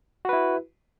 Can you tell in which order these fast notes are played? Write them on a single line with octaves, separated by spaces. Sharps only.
F#4 B4 E4